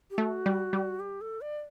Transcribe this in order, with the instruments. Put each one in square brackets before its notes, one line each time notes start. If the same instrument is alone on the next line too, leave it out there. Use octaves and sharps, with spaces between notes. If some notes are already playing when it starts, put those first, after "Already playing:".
[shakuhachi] G4
[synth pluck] A3 [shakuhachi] F#4
[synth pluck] G3
G3
[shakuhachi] G4
A4
D5